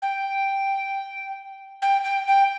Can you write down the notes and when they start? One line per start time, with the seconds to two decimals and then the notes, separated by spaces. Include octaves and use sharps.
0.02 G5
1.82 G5
2.04 G5
2.27 G5